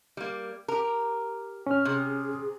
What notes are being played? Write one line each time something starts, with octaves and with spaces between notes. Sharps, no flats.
G3 A#3
G4 A#4
C#4 F6
C3 G#4